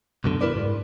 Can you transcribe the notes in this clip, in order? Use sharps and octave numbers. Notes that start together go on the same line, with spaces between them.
C2 F#2 B2 D3
E4 A#4 B4 D5
G#2